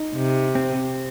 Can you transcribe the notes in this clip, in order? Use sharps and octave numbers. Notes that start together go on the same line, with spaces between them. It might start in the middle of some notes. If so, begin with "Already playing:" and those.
Already playing: D#4
C3
C4